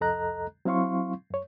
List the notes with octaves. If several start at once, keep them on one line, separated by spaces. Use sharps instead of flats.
C2 F2 A4 D#5 A#5 F#6
F#3 C4 E4 F5 C6 C#6
F#2 C#5